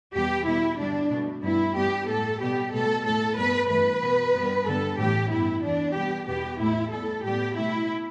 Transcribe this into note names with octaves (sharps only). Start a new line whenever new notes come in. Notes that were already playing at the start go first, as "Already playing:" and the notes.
E2 B2 G3 B3 G4
B2 G3 B3 E4
G2 D3 G3 D4
B2
A3
G2 G3 B3 E4
G2 G3 B3 G4
A2 A3 A4
B2 G3 B3 G4
B2 A3 A4
A2 A3 A4
G2 G3 B3 B4
G2 E3 A3 B4
B2 B3
G2 G3 B3
G2 D3 G3 B3 A4
A2 E3 A3 G4
G2 E3 B3 E4
E2 E3 B3 D4
B2 G3 B3 G4
E2 B2 B3 G4
A2 A3 E4
A2 G3 B3 A4
A2 G3 B3 G4
B2 A3 E4